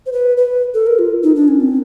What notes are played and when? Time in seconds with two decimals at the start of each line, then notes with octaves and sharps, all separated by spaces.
0.06 C5
0.13 B4
0.37 B4
0.74 A4
0.87 A#4
0.99 F4
1.23 D#4
1.36 D4
1.48 C#4
1.60 C4